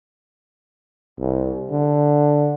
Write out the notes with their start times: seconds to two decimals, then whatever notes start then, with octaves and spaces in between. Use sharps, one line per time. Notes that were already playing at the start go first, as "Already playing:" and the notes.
1.18 C2
1.70 D3